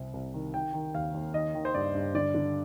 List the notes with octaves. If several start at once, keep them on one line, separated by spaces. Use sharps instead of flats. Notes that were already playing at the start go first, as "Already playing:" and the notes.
Already playing: C2 C3
C2
D#3
D#3 G5
D#3
D#2 F5
D#2
D#3 D#5
D#3
C5
G2 D5
G2
D3 D5
D3